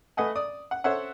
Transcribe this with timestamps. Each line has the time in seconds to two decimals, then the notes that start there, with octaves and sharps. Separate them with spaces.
0.17 A3 B4 D#5 F#5 G#5
0.36 D5 D#6
0.71 F#5
0.84 A4 C5 C#5 E5 F#5